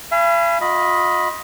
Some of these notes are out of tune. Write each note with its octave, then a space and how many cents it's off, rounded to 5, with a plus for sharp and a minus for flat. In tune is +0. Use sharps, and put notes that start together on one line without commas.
F5 -45 G#5 +0 B5 +0
F4 +35 D#5 +5 B5 +0